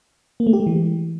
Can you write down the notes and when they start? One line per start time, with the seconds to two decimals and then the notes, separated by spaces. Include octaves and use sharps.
0.40 A#3
0.47 A3
0.53 G4
0.60 G#3
0.67 E3